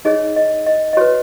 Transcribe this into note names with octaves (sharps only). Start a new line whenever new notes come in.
D#4 G#4 C#5 D#5
D#5
D#5
D#5
F#4 B4 C#5